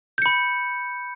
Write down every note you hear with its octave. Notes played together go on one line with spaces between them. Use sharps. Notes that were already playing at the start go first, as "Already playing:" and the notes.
B5 G6 C#7